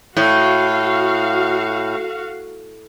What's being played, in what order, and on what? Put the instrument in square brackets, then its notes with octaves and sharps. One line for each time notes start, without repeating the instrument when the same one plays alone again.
[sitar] A2 [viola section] F#4 F5